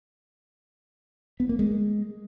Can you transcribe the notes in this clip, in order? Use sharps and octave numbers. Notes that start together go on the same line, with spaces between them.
B3
A#3
G#3